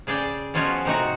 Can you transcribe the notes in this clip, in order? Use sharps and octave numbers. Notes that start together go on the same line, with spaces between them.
C#3 G#4 D5 G5
B2 F3 C#4 F4 F#4 G#5
C3 D#4 F#4